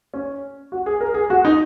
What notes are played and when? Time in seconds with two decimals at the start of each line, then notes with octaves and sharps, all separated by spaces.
0.14 C#4
0.72 F#4
0.86 G#4
1.01 A#4
1.14 G#4
1.30 F#4
1.45 D#4